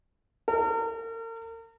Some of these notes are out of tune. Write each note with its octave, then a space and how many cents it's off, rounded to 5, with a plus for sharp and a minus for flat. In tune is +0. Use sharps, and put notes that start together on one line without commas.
A#4 -40